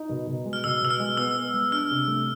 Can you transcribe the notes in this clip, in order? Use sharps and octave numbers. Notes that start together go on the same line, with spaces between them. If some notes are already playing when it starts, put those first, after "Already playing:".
Already playing: D#4
B2
B2
G#3
F6
B2 E6
B2 E6
F6
G#3
B3 E6
B3
G#3
D4 F6
C3
A3